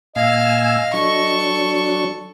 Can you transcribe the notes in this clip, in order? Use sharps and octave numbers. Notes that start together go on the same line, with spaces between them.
A#2 D#5 F5 G#5 E6
F#3 D4 A4 C#6